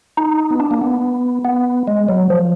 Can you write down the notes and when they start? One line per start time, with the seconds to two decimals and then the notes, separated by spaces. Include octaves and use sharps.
0.17 D#4
0.50 B3
0.60 D4
0.71 A#3
0.81 B3
1.45 B3
1.88 G#3
2.09 F#3
2.30 F3